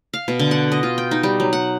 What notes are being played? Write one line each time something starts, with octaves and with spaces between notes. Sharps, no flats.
F5
B2
D3
F#5
D#5
F4
G5
D#4
G3
F#3
F#5